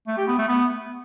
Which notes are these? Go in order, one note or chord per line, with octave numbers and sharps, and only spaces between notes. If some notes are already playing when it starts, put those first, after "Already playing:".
A3
G4
B3
A3
B3